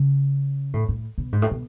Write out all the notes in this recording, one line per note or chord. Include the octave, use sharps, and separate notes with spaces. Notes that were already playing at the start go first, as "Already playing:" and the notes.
Already playing: C#3
A2
A2
B2
G#2
A2
B2